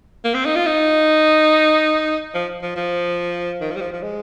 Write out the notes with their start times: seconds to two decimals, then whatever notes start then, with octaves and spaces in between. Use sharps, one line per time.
0.25 A#3
0.34 C4
0.46 D#4
0.55 F4
0.66 D#4
2.34 F3
2.62 F3
2.76 F3
3.61 D#3
3.71 F3
3.76 G3
3.81 F3
3.92 F3
4.03 G#3